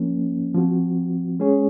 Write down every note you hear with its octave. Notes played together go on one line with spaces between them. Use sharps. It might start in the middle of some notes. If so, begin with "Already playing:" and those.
Already playing: F3 A#3 C#4
F3 C4 F#4
G#3 C#4 G#4 C#5